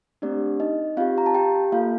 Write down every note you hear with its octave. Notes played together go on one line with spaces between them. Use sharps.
A3 C4 D4 G4 D5
D#4 D#5
C4 F4 G4 F5
A#5
A5
G4 G5
A#3 F4 A4 F5